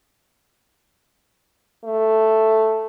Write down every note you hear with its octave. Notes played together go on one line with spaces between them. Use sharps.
A3